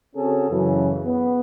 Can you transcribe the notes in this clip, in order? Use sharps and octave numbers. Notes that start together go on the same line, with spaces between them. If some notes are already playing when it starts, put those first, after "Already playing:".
C#3 C4 C#4 F#4 G#4 A4
F#2 C#3 E3
B3